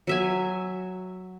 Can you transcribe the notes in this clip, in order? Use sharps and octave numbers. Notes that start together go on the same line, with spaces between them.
F#3 E5 G#5